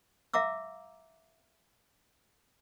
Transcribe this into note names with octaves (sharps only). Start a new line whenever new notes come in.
E5 F5 A#5 D6 E6